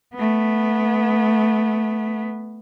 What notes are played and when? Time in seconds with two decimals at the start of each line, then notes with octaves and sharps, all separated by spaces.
0.15 A3 B3